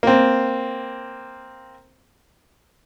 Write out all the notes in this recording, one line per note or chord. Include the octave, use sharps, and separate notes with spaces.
A#3 C4